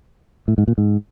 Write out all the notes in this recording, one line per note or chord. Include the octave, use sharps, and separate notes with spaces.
A2
G#2
A#2
G#2